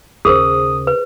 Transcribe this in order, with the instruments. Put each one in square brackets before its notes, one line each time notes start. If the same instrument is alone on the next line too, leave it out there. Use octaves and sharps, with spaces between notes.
[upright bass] D#2 C#3 [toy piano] G#4 A#4 C5 [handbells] D#6
[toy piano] B4